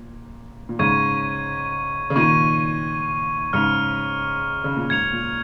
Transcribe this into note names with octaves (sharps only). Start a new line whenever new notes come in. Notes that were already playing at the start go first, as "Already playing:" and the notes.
Already playing: A#2
A#2
G#2 C#3 C#6 G#6 D#7
C#3
A#2 D#3 C#6 G#6 D#7
G#2 C#3 F6 C#7 F7
C#3
A#2
G#2 G#6 C#7 F7
A#2